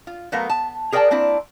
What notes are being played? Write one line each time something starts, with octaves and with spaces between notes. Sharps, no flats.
F4
F#3 A3 B3 A#4 F5
A5
G#4 A#4 D5 F5 G5 A5
A#3 C4 D4 E4